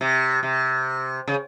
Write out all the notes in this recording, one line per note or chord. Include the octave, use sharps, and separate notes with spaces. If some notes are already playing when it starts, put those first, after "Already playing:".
C3
C3
C#3